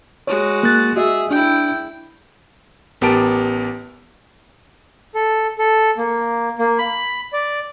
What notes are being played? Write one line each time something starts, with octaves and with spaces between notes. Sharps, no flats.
G#3 F#4 C#5
A#3 F#6 A6
F#4 G#4 D#5 E5
D4 E4 G5
A1 B3 G4 A#4 A5 D7
A4
A4
A#3
A#3
B5
D5